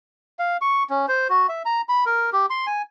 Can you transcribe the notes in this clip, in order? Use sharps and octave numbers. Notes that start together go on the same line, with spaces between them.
F5
C#6
C#4
C5
F#4
E5
A#5
B5
A#4
G4
C6
G#5